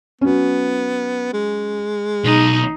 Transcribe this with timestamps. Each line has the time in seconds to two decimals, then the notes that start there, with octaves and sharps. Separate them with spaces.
0.21 F#3 B3 C#4
1.33 G#3
2.24 B1 B2 D#4